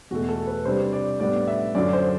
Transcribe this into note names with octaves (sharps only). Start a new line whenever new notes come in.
E2 B2 A3 F#4
A4
B4
C3 G3 D4 C5
D5
A2 G3 B3 D4 D5
E5
F#2 D3 F#3 D5
C5